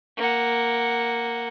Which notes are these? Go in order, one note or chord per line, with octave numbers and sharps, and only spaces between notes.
A#3 F#5